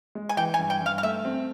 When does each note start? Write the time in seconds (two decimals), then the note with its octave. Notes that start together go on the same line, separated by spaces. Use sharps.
0.15 G#3
0.29 G#5
0.37 E3 G5
0.54 G#5
0.59 G2
0.70 G5
0.81 G2 F5
0.98 F5
1.03 A3 E5
1.25 C4